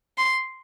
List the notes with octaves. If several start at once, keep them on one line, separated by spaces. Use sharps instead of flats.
C6